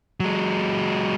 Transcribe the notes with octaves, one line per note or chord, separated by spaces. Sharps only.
F#3 G#3